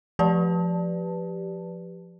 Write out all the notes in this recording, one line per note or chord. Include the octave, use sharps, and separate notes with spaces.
F3 G4 B4 D5 A5